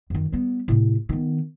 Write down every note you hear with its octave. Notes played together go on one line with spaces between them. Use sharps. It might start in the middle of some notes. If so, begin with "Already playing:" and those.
F#2 D#3
G3 B3
A2 C3
D#3 B3